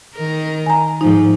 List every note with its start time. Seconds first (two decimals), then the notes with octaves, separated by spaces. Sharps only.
0.14 D#3 A#4
0.66 G#5 A#5
1.01 G#2 F3 D#4